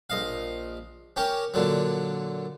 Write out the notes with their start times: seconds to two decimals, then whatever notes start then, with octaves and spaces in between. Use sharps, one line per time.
0.10 A#1 D#5 F5
1.16 C#4 G4 A#4
1.54 A#2 D3 F#3